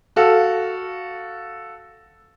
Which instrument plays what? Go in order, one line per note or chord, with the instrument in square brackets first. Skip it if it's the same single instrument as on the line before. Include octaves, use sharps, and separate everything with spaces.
[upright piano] F#4 A4 F5